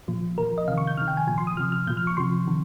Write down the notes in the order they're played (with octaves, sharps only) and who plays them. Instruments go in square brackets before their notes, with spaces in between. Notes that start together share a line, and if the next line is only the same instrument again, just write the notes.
[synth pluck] A#2 F3
A#2 F3 A#4
D#5
C3 D#3 F5
C#6
G6
C3 D#3 F6
G5
G#5
A#2 F3 G#5
C6
D#6
C3 F3 F6
F6
A#2 G6
F3
F6
C#6
C3 F3 C6
C3 D#3